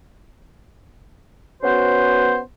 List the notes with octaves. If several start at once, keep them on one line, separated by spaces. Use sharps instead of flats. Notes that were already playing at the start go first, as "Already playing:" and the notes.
B3 C#4 F#4 B4 C5